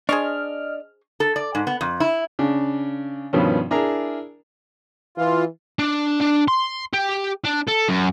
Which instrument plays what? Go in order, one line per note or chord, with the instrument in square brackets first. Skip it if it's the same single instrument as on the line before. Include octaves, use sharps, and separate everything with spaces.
[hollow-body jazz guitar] D4 [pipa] G#4 C5 C#6 [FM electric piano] D#5 F6
[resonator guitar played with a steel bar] A4
D5
G#2
B3
F2
E4
[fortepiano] C#3 D4
G2 B2 D#3 F3 C#4
D4 E4 G#4 A#4 A#5
[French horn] E3 [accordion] F4
[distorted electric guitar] D4
D4
C6
G4
D4
A4
F#2